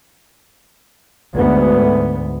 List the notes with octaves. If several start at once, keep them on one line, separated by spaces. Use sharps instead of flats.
D2 G#2 B3